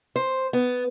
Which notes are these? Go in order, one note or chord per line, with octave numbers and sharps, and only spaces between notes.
C5
B3